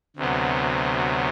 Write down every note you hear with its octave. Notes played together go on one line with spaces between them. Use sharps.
D2 C3 F#3 B3